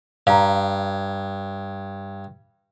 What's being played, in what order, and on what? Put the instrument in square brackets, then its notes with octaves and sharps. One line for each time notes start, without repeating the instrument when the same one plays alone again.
[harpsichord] G2 [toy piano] F5 A#5